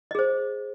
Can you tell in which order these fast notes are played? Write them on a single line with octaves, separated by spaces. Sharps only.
D#5 G#4 C5